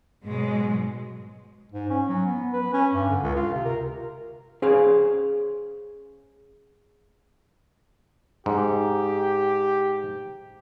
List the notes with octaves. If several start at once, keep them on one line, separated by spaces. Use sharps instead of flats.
G#2 B2 F#3 G#3
G#2
C#4
F#3
B3
B4
C#4
G2
D3
C#2
F4
C3
A#4
C#4 G#4 C5 F5
G#2 G4